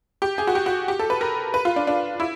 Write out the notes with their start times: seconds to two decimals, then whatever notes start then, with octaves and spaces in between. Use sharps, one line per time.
0.22 G4
0.38 G#4
0.47 F#4
0.55 G4
0.66 F#4
0.88 G4
0.99 A4
1.10 B4
1.21 A#4
1.54 B4
1.65 F4
1.76 D4
1.87 D4
2.20 E4